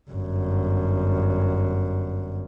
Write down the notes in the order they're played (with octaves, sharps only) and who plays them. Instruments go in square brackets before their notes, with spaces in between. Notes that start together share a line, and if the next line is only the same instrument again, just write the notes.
[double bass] G1 F#2